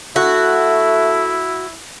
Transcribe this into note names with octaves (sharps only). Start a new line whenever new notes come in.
A3 E4 F#4